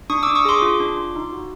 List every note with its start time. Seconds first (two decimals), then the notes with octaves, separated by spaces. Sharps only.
0.10 D4 C#6 D#6
0.23 D4 D6 E6
0.35 C#6 D#6
0.45 G#4 C6 D6
0.62 F4
0.80 D4
0.97 F4
1.15 D#4
1.32 F#4